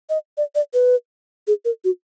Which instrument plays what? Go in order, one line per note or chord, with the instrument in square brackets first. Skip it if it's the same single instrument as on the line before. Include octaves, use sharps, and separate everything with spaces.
[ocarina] D#5
D5
D5
B4
G#4
A#4
F#4